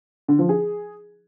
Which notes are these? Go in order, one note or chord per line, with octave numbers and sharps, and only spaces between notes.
D3
F3
G#4